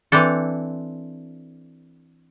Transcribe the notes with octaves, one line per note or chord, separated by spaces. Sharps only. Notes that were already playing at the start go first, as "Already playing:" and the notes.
E3 C4 D4 A4